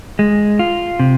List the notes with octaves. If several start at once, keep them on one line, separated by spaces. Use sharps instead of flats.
G#3
F4
C3